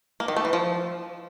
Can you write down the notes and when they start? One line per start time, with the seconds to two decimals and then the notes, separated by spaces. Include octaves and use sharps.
0.20 A#3
0.28 D#3
0.37 A3
0.45 E3
0.53 F3